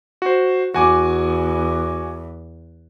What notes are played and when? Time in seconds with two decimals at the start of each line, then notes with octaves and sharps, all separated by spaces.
0.22 F#4 C5
0.74 E2 F#4 G#5 D6